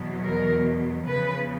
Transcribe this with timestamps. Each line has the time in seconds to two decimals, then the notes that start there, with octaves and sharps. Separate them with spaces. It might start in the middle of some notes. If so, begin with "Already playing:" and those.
Already playing: E2 B2 F#3
0.26 A#4
1.07 E2 C#3 F3 B4